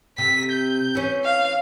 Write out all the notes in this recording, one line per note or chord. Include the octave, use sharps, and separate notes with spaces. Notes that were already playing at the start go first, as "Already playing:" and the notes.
C3 B6
G6
E3 C#4
F5